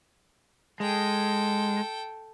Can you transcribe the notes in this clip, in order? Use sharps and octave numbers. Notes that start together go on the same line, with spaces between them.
G#3 A4 G5